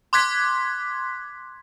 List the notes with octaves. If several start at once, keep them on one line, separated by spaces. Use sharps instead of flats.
C6 D6 F#6 G#6 B6